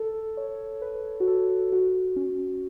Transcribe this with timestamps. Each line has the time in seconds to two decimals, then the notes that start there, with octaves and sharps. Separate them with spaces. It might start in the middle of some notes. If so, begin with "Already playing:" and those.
Already playing: A4
0.37 C#5
0.82 B4
1.20 F#4
1.27 A4
1.72 F#4
2.16 C#4